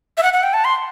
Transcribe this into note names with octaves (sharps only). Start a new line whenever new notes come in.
E5
F#5
F#5
G5
A5
C6